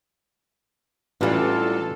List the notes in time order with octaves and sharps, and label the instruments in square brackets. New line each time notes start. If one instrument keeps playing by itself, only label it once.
[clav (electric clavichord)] A1 [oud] E3 G3 [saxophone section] F#3 D4 F4 [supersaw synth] A4